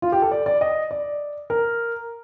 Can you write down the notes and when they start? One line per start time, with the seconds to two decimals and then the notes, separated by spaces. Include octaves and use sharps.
0.02 F4
0.12 G4
0.22 A4
0.31 D5
0.46 D5
0.61 D#5
0.91 D5
1.50 A#4